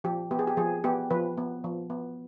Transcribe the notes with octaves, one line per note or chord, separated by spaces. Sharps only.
F3 G4
B3 G4
G#4
G4
F3 G#4
B3 G4
F3 B4
B3
F3
B3